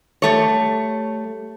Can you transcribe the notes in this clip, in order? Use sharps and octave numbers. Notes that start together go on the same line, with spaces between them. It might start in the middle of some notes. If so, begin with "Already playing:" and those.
G3 A3 C#5